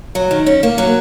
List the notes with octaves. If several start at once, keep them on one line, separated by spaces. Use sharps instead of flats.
F#3
D#3
C#4
A#3
F#3